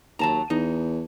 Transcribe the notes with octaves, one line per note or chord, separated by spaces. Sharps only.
D#2 F#3 A5 A#5
E2 D#4